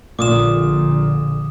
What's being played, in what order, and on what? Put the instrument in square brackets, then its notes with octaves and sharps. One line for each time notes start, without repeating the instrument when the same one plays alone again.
[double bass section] A#1 D3 [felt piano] A#2 [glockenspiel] D6 D#6 E7